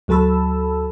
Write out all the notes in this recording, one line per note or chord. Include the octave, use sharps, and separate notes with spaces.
D2 F#3 A4 A5 B5 E6